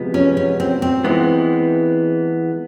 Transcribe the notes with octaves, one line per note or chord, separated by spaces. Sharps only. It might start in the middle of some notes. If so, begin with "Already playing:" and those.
Already playing: C3 F3 G#3 B3
C#4
C#4
C4
C4
E3 G#3 B3